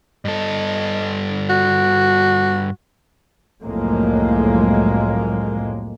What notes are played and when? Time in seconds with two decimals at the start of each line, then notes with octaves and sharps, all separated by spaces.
0.25 G2 A4 D#5
1.50 F#4
3.62 C2 F2 A2 F#3 G#3 A#3